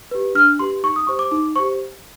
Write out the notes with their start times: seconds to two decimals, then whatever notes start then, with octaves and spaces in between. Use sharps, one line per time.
0.11 G4 B4
0.35 D4 F6
0.59 G4 B4 C6
0.83 D#4 C#6
0.96 D#6
1.07 G4 C5 C#6
1.19 D6
1.31 D#4 D6
1.56 G4 C5 C#6